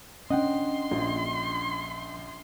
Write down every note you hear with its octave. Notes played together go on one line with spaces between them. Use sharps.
C#4 D4 D#5 F#5 G5 C6
A#1